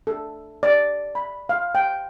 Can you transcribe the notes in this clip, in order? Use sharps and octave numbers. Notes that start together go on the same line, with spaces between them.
A4
D5
B5
F5
G5